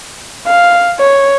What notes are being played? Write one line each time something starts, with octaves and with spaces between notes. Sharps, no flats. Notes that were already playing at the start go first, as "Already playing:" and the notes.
F5
C#5